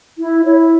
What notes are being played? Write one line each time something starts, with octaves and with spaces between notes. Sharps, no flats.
E4
E4 C#5